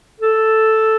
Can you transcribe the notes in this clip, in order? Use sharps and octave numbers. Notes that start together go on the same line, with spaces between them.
A4